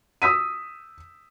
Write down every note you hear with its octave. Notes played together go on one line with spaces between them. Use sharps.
D#6 E6 B6 D#7